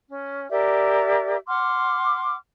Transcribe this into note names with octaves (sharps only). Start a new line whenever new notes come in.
C#4
G4 A#4 D5 E5
F#5 C6 D6 F6